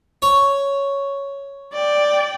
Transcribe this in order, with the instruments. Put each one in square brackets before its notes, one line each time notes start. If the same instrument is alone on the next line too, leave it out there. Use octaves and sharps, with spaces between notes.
[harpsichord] C#5
[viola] D5 G5